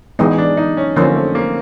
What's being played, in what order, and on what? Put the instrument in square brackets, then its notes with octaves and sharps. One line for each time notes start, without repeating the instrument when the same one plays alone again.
[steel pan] E3 G#3 B3 [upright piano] D#4
[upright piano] D4
D#4
C#4
[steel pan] D3 F3 A#3 C#4 [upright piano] C4
[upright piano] A3
A#3